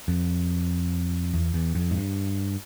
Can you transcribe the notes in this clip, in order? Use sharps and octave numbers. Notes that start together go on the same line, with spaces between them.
F2
E2
E2
F2
G#2
G2